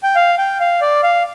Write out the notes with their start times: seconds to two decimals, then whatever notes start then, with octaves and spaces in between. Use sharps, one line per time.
0.03 G5
0.16 F5
0.38 G5
0.60 F5
0.81 D5
1.03 F5